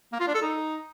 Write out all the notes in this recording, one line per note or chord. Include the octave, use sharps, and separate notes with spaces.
A#3
F4
D4
A4
D#4